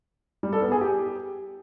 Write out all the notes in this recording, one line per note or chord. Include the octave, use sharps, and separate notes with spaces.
G3
A4
B3
G#4
G4